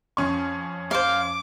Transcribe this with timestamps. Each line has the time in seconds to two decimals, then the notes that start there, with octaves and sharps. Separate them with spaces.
0.17 F2 C#4 C#6
0.91 C5 F5 D6